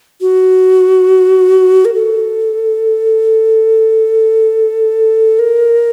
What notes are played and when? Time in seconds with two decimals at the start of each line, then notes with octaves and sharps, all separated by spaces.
0.21 F#4
1.85 A#4
1.94 A4
5.39 A#4